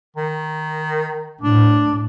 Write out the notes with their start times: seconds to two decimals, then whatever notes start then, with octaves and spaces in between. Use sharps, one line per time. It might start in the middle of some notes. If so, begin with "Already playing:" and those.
0.16 D#3
1.41 A2 D4